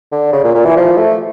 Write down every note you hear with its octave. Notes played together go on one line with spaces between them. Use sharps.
D3
C#3
A#2
A#2
E3
F3
A3